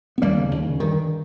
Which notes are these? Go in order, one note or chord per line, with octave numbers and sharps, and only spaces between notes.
B3
D#2 G3 A#3
C#3
D#2
C#3
G2 D#3